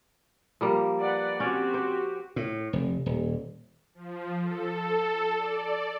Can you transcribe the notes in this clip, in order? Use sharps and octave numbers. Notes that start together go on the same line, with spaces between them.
F3 G3 A#3
B4 D5 F#5
C4 C#4 F#4 G4 D5
C5
A2
F1
D#1
F3
A4
D5